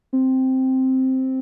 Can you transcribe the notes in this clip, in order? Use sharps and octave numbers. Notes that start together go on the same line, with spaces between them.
C4